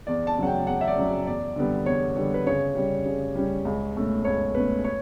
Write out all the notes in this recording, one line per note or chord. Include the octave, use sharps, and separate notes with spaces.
E2 D5
A5
C#3 F#3 C#4 F#5
G5
E2 F#5
E5
D5
C#3 F#3 C#4
E2 D5
D3 G3 B3
E2 C#5
D3 G3 B3
B4
C#3 C#5
G3 C#4
C#3
G3 C#4
C#2
B2 A3 C#4
C#2 C#5
B2 A3 C#4 B4
C#5